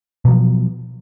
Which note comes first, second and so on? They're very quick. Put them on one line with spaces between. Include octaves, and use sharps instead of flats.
B2 F#3 F3